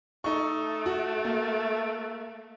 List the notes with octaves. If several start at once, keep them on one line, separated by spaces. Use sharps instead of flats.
A3 D#4 C#6
F#4
A#3